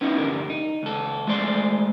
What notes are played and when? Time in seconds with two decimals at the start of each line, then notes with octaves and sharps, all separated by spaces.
0.01 B3 C#4 D#4 E4
0.17 C2 G2 D3 G4 A#4
0.50 D#4
0.83 C#2 A4
1.27 G#3 A3 A4 C5 D5 C6